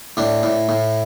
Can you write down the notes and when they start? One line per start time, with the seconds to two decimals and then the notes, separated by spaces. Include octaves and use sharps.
0.17 A2 D4
0.43 A2
0.69 A2